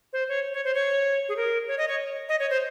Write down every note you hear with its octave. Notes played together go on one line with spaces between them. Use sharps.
C5
C#5
C#5
C5
C#5
G#4
A#4
C#5
D#5
C#5
D#5
C#5
C5